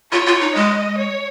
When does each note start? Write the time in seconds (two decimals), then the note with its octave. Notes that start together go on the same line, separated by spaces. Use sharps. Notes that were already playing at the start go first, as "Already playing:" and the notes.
0.12 F4 C#5
0.26 F4
0.41 D#4
0.55 G#3 D#5
0.98 C#5